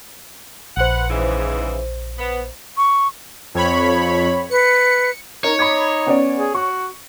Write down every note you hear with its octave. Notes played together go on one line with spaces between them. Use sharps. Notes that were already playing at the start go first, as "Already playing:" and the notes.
A#1 B4 C5 F#5
G#2 C#3 E3
B3
C#6
F2 C#5 B5
B4 C#7
D#4 A#4 C#5
D#4 B5 D6 G#6
B3 C#4 D5
G#4
F#4 C#6